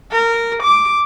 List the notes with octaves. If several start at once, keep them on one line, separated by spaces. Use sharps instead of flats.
A#4
D6